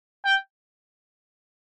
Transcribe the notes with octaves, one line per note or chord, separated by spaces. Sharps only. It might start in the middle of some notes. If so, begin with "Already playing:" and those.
G5